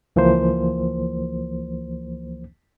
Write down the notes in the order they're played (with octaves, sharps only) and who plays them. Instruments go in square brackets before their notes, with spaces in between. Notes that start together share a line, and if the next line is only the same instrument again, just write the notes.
[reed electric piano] C#2 E3 F3 A#3 C5